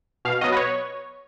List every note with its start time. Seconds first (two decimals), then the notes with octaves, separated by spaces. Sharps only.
0.25 B2 F5
0.41 F#3 B3 D#5
0.52 B4
0.57 C#5